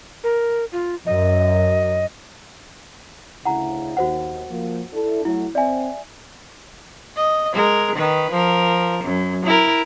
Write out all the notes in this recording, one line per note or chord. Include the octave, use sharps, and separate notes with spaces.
A#4
F4
F#2 D#5
D2 C#3 E4 F#5 A#5
D#2 F#4 C5 F#5
F3 A#3
D4 E4 A4
F#3 A3 E4 F#4
C4 D5 E5 G#5
D#5
G#3 A#4
D#3 B4
F3 A#4
F#2
E4 A#4